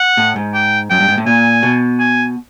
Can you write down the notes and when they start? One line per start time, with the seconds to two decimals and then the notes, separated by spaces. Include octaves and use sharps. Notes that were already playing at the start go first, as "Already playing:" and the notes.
Already playing: F#5
0.17 A2
0.36 G#2
0.54 G5
0.90 F#2 G5
1.00 G2
1.08 G#2
1.18 A2
1.26 A#2 G#5
1.63 B2
1.99 G#5